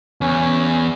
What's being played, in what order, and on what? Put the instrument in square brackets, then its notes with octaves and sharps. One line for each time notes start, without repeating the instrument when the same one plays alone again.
[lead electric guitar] E2 [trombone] C#4